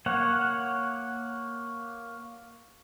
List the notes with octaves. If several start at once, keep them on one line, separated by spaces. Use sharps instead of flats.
A#3 C#5 F#5